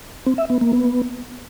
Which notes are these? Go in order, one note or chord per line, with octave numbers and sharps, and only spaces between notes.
C4
E5
B3
A#3
B3